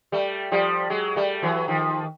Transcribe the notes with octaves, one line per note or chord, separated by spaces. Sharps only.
G3 A3
F3 G3
F#3 G#3
G3 A3
E3 F#3
D#3 F3